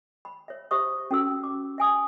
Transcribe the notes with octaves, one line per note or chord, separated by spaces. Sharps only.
B5
C#5 E5
G4 C5 E5 C#6 D#6
C#4 F#4 A4 E6
D6
E5 G#5 D#6